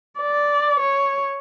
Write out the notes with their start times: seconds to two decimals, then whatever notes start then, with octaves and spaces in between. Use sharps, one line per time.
0.20 D5
0.80 C#5